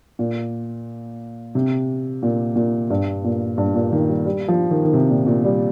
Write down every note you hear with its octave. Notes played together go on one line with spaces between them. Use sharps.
A#2
C3
A#2
A#2
G2
A#2
G2
A#2
D#3
G3
G3
F3
D#3
D#3
C3
A#2
A#2
G3